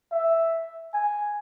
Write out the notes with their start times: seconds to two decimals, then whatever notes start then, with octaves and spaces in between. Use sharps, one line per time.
0.12 E5
0.94 G#5